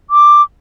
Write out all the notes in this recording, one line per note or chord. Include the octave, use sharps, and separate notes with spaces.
D6